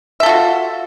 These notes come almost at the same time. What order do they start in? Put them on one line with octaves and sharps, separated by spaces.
E5 A4 F4 F#4